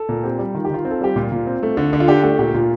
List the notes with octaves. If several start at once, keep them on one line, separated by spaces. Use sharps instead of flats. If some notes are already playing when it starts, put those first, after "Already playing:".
Already playing: A4
A#2
C4 G4
G3
D#3 F4
G4
D#3 F4
C4
A4
G3 G4
A#2 F4
A#2
C4
A3
D3
D3
F4
D4 G4
A3 G4
A#2 G4
A#2 F4